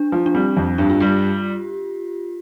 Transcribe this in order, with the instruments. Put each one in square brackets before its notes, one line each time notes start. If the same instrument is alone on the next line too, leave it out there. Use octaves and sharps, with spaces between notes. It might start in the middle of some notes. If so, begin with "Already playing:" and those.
Already playing: [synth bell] D4
[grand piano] F3
[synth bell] D4
[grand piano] G3 [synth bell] C4
[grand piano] F2
[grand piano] G2 [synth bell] D4
[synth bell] F4
[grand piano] G3 [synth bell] G4